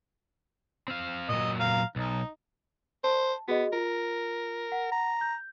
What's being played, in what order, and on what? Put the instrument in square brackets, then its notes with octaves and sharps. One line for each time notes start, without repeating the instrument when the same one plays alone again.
[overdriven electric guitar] C4 F5
[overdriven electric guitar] A#2 F#3 [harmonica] D#5
[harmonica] F5 A#5
[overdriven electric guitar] B1 [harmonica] D#4
[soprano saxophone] C5 [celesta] A5
[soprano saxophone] B3 [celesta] F#4 G#4 D#5
[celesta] F4 [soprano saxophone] A#4
[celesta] F#5
[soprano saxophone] A#5
[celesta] G6